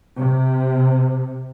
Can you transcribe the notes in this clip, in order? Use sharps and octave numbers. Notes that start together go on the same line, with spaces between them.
C3